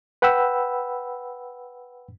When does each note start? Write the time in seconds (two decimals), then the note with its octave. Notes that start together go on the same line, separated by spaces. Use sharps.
0.22 B4 F#5 G5 B5 E6